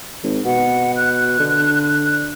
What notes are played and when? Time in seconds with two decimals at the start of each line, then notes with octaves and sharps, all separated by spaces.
0.23 G#1
0.45 B2 F#5
0.96 F#6
1.40 D3